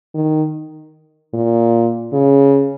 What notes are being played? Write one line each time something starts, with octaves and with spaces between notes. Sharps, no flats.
D#3
A#2
C#3